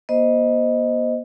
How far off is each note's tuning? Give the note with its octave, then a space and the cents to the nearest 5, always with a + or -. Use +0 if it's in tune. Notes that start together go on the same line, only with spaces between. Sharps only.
B3 -45 C5 -10 D#5 +0